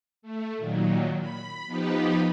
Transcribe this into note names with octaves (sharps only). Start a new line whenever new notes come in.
A3
A#2 D#3 F#3
B5
F3 B3 D#4 G4 B4